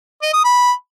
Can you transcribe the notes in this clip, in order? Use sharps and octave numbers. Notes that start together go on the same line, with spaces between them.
D#5
D#6
B5